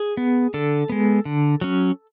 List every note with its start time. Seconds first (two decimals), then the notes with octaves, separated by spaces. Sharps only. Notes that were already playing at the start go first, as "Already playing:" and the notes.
Already playing: G#4
0.17 B3
0.54 D3 A4
0.89 G#3 B3
1.25 D3
1.61 F#3 C#4